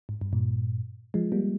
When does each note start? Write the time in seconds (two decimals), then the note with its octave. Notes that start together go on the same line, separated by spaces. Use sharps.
0.09 G#2
0.21 G2
0.33 G2 A#2
1.14 F3 G#3
1.32 G3 A#3